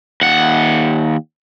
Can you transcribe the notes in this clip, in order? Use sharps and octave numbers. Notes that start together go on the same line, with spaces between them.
D#2 F#5